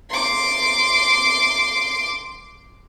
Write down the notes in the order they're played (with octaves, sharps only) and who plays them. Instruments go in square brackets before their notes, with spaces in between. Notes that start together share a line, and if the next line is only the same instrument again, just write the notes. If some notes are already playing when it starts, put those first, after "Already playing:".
[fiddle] C6 D6